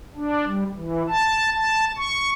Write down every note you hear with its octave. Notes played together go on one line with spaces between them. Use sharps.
D4
G3
E3
A5
A5
C#6